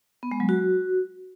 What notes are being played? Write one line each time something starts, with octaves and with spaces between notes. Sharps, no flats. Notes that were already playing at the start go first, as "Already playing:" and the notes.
B3
G#3
F#3
F#4